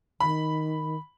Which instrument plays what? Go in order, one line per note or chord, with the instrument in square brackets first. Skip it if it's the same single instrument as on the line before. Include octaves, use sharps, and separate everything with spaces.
[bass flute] D#3 [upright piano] B5